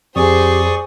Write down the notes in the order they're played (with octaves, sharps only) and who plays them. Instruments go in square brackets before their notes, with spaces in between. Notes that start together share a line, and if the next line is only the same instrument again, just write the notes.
[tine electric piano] F2 [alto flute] G4 [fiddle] G#4 C5 [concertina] D5 C#6 D#6